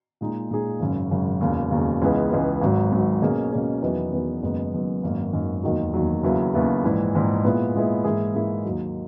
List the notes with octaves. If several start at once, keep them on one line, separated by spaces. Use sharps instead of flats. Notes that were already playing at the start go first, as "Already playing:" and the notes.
A#2 G#3 D#4 G#4
A#2 G#3 D#4 G#4
G#1 F#2 C#3
G#1 F#2 C#3
E1 D#2 C#3
E1 D#2 C#3
C#2 C#3 E3 G#3 B3
C#2 C#3 E3 G#3 B3
G#1 G#2 F#3
G#1 G#2 F#3
B2 A#3 C#4 G#4
B2 A#3 C#4 G#4
E2 D#3 F#3 B3 E4
E2 D#3 F#3 B3 E4
F#1 F#2 D#3 G#3 B3
F#1 F#2 D#3 G#3 B3
G#1 F#2 D#3 A#3
G#1 F#2 D#3 A#3
E1 D#2 D#3 F#3
E1 D#2 D#3 F#3
D#2 C#3 F#3 B3 E4
D#2 C#3 F#3 B3 E4
A#1 G#2 E3
A#1 G#2 E3
A#2 G#3 B3 E4
A#2 G#3 B3 E4
G#2 E3 A#3 E4 G#4
G#2 E3 A#3 E4 G#4
D#2 D#3 F#3